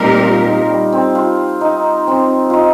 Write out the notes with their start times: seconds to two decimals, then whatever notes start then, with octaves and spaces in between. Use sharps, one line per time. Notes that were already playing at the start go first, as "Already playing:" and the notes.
Already playing: A#2 G3 C4 D#4 G4 A#4
0.24 F4
0.47 D#4
0.70 G3
0.93 C4
1.15 F4
1.61 D#4
2.07 C4
2.50 D#4 F4